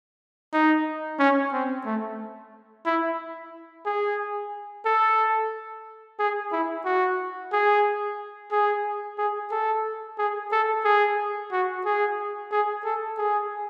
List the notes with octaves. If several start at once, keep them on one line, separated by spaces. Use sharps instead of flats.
D#4
C#4
C4
A3
E4
G#4
A4
G#4
E4
F#4
G#4
G#4
G#4
A4
G#4
A4
G#4
F#4
G#4
G#4
A4
G#4